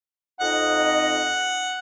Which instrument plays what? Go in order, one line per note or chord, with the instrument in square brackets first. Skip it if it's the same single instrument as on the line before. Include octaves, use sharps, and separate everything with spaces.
[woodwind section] F2 D#4 D#5 [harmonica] F#5